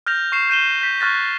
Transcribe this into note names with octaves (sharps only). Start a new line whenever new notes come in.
F6 G6 A#6 F7
C#6 C7 E7
G6 D#7 E7 G7
G6 B6
C#6 F6 F#6 A6 A#6